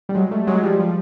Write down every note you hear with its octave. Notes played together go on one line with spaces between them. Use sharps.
G3
F#3 G#3
G3 A3
F#3 G#3
F3 G3
F3 G3